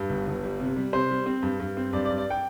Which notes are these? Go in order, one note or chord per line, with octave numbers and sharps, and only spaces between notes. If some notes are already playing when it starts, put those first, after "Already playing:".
Already playing: G2
G1
G1
G3
C3
G3
C3 C5
G3
C4
G2
G2
C4
G2 D5
D5
G2
D5
G5